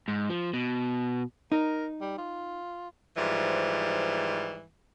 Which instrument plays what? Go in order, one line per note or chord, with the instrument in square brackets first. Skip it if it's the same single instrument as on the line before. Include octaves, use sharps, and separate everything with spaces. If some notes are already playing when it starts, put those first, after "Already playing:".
[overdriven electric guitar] G#2
F3
B2
[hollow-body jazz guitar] D#4 [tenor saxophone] A#4
[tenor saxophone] G3
F4
[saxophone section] G#2 E3 F3 G3